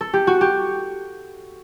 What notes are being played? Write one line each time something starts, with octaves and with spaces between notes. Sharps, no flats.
A4
G4
F#4
G4